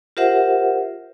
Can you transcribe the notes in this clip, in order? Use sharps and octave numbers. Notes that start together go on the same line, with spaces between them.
F4 G4 A#4 C5 E5 F#5